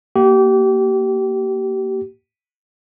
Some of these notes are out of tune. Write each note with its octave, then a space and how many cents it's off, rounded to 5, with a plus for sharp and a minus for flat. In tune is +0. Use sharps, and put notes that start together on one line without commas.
A#3 +0 G4 -30